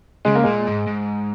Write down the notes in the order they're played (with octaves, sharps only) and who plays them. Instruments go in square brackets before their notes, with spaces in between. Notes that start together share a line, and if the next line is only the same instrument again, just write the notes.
[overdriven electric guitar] C#3 [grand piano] G#3
[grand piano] A#3
[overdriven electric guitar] A#2 [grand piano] G#3
[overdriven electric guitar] G#2
G#2